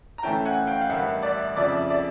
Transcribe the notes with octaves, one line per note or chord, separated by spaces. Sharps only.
A#5
A2 E3 A3 C#4 E4 G5 A5
F#5 G#5
F5 G5
F5
A1 G2 D#3 E5 F#5
D5 E5
F2 C#3 F3 D5 E5
D5 E5